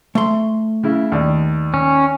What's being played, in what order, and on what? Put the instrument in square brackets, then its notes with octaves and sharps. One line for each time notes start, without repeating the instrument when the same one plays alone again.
[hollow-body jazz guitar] A3 C6
[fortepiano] C#3 E4
D#2 D5
[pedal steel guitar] C#4